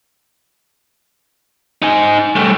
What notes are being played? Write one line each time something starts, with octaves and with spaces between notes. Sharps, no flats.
D#4 G#5
G3 A3